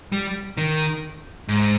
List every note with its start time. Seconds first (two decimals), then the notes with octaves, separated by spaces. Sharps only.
0.12 G3
0.57 D#3
1.48 G#2